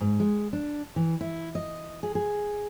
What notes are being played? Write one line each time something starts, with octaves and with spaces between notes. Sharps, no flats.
G#2
G#3
D4
E3
E4
D#5
G#4
G#4